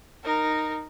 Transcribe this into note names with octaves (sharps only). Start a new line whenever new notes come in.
D#4 A#4